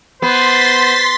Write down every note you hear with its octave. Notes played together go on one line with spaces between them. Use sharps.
B3 C5 C6 A6 B6